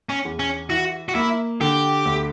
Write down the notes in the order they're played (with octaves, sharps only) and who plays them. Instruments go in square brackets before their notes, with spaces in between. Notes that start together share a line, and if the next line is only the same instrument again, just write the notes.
[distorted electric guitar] C#4
[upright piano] E2
[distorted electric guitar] C#4
[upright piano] E3 [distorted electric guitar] F#4
[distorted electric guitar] F#4
[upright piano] A#3 [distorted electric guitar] E4
[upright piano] D3 [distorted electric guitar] G4
[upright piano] D2